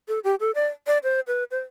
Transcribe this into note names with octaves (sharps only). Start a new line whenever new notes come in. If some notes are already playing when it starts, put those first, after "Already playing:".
A4
G4
A4
D5
D5
C5
B4
C5